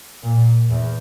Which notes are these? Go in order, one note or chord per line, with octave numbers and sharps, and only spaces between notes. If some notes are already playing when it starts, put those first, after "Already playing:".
A#2
E2